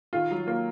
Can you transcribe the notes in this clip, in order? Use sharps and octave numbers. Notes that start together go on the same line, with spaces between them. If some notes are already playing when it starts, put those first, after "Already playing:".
D#3 F4
F#3
A#3 F4